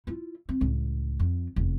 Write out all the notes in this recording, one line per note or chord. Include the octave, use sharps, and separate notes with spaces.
E4 F4
C4
C#2 A2
F2
F1 E2